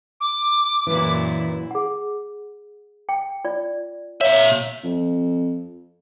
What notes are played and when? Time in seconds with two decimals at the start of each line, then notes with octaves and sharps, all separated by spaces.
0.21 D6
0.87 F#2 A#2 E3 E4
1.71 G#4 F#5
3.09 G5
3.45 F4 D5
4.21 A#2 C#5 E5 F5
4.84 F2